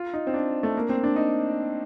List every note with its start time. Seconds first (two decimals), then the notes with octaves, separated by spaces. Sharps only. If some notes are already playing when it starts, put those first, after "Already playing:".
Already playing: F4
0.14 D#4
0.27 C4
0.34 D4
0.63 A3
0.77 A#3
0.89 C4
1.03 D4
1.16 D#4